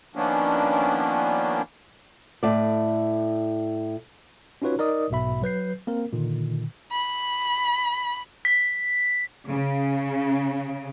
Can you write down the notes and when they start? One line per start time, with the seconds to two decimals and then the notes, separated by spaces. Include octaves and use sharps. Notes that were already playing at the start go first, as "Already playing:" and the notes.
0.16 D#3 F3 A#3 B3 C#4 D4
2.43 A2 D5
4.62 C#4 D#4 F4 F#4 B4 C#5
4.78 D#4 A#4 D5 D#5 D#6
5.10 B1 G#2 B2 E5 B5
5.42 F#3 B4 G6 C7
5.87 A#3 C4 A#4
6.13 A#2 D3 D#3
6.92 B5
8.45 B6
9.49 C#3